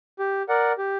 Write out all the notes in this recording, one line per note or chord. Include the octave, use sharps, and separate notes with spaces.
G4
A#4 D5 F#5
G4